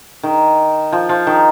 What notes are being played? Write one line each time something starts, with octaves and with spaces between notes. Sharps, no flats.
D#3
F3
F3
D#3